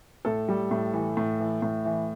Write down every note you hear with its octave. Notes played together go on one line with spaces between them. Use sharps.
A2 A4
G3
A2
E3
A2
E3
A2
E3